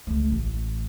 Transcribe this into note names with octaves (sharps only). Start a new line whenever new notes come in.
C#2 A3
A1